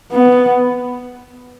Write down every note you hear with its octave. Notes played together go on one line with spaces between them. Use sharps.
B3